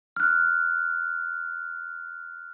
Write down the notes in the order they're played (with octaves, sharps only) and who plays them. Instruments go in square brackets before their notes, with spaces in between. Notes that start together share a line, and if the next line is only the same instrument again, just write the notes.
[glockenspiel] F6 F#6